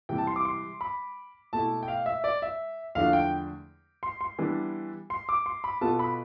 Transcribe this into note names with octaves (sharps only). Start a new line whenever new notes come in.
C3 E3 G3 G5
A5
C6
D6
C6
B5
B2 A3 E4 A5
G5
F5
E5
D5
E5
E2 D3 F3 A3 D4 F5
G5
C6
C6
E3 G3 B3 D4
C6
D6
C6
B5
B2 B3 F4 A4 A5
B5